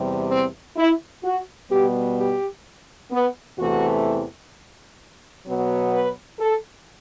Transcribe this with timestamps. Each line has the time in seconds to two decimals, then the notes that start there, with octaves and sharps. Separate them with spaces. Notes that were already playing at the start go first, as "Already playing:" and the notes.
Already playing: E2 C3 G3
0.29 C4
0.77 E4
1.24 F#4
1.70 B2 G3 B3 G4
2.18 G4
3.12 B3
3.58 E2 C3 E3 A3 F#4
5.46 B2 F#3 B3
5.93 B4
6.40 A4